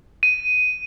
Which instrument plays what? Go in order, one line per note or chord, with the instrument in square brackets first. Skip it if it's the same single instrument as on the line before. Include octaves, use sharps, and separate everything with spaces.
[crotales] D#7